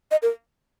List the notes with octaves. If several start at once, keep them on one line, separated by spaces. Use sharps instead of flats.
D#5
A#4